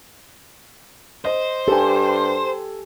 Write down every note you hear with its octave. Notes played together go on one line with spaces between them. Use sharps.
C5 D#5
G2 G4 A4 G#5